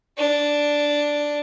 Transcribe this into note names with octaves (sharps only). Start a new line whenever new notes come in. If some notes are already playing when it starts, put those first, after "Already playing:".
D4